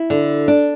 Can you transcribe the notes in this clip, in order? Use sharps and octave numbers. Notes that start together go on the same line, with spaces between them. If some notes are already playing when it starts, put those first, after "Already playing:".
Already playing: E4
D3
D4